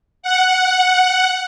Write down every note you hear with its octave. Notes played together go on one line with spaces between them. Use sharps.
F#5